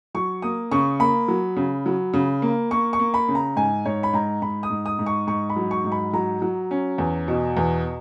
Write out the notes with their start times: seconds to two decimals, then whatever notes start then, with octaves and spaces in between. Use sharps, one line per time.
0.14 F#3 C#6
0.42 A#3 D#6
0.71 C#3 C#6
1.00 A#3 B5
1.28 F#3
1.56 C#3
1.86 F#3
2.14 C#3
2.42 A#3
2.71 A#3 C#6
2.93 C#6
2.99 A#3
3.14 B5
3.28 C#3
3.35 A#5
3.56 G#2 G#5
3.86 G#2 C#5
4.03 B5
4.13 G#2 A#5
4.42 G#2 B5
4.63 D#6
4.70 G#2
4.86 D#6
4.99 G#2
5.06 C#6
5.27 G#2 C#6
5.50 B5
5.56 F#3
5.71 C#6
5.84 G#2
5.92 B5
6.13 F#3 A#5
6.42 F#3
6.71 C#4
6.98 E2
7.28 B2
7.57 E2